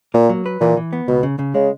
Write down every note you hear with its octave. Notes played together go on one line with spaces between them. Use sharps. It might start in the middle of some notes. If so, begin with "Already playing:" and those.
A#2 A#3
F#3
B4
A#2 E3
E3
B3
C#2 B2
C#3
C#3
C#3 G#3